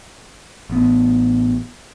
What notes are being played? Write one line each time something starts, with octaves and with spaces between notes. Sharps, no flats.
A1 B3